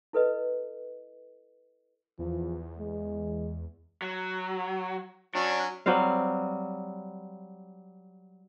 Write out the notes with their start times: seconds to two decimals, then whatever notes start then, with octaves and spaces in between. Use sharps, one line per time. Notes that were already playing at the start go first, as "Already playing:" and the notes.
0.13 E4 A4 B4 D#5
2.19 E2 F3
2.79 G#3
4.02 F#3
5.35 F#3 C#4 D4
5.86 F#3 G3 C4 F5